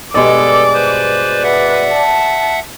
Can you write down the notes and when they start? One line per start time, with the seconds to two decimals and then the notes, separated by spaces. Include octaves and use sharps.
0.14 G2 B2 G#3 A4 D5 D6
0.73 B4 C5
1.43 B4 E5 F#5
1.93 A5